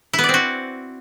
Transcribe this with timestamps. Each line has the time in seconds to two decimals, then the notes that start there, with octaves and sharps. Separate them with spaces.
0.13 E4
0.19 B3
0.24 D5
0.29 C4
0.34 F#4